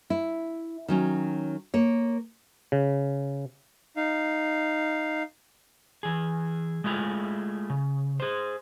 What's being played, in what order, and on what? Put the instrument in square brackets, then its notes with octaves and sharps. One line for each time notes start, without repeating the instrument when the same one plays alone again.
[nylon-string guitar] E4
D#3 F#3 C#4
A#3 C#5
[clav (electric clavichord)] C#3
[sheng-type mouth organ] D#4 F5
[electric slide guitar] E3 G#4
G#3 A3 E4 F4 G#4
C#3
G#4 C5